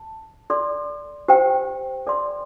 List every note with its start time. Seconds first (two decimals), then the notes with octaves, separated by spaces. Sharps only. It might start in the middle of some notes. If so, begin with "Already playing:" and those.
Already playing: A5
0.50 A4 D5 C6
1.28 G4 C5 G5
2.07 A4 D5 C6